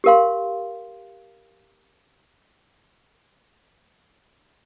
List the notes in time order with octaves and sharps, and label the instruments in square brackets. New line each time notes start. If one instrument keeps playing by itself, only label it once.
[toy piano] G4 A#4 F5 C6